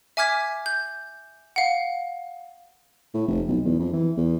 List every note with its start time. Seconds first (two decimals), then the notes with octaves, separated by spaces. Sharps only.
0.17 E5 G#5 D6 F6 G#6 B6
0.66 G6
1.56 F5 F#5
3.14 A2
3.28 F1
3.49 B1
3.65 E2
3.79 F2
3.93 E3
4.17 E2